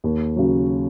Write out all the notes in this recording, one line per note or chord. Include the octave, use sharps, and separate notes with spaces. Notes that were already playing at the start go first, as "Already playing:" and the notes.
D#2
C#3 F#3